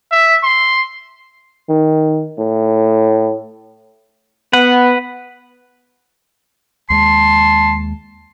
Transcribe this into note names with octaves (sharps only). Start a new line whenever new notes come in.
E5
C6
D#3
A2
B3 B4 F#5
D#2 G#3 A5 C6